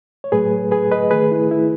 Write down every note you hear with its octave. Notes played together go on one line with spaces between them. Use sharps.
C#5
A2 F#3 A3 G#4 B4
G#4 B4
B4 D#5
D#3 A3 G#4 B4
E4
E4